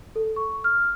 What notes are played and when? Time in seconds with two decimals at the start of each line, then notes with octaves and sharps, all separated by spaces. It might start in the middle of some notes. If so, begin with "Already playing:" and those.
0.16 A4
0.36 C#6
0.64 F6